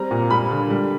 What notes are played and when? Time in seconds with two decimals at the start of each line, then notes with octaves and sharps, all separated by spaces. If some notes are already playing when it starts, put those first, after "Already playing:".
Already playing: G3 C4 A#5
0.11 A#2
0.30 G3 B5
0.51 D3
0.70 G3